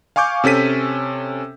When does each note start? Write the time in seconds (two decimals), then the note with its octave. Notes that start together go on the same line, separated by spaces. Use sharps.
0.16 F5 G#5 C#6 D6 G6
0.44 C3 C#4 A4 B6 D#7